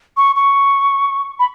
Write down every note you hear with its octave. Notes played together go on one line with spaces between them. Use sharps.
C#6
C#6
B5